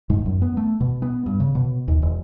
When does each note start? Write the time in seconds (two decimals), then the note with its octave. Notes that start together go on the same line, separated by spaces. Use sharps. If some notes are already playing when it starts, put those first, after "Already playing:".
0.10 G#2
0.26 F#2
0.42 B3
0.57 A3
0.80 B2
1.02 B3
1.26 G2
1.40 C#3
1.55 B2
1.88 D#2
2.02 E1